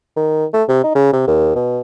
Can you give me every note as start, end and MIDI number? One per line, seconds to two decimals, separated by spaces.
0.16 0.45 51
0.54 0.63 57
0.69 0.80 48
0.84 0.92 63
0.95 1.12 49
1.13 1.25 48
1.27 1.55 39
1.55 1.81 47